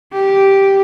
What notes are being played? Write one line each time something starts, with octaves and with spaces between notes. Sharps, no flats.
G4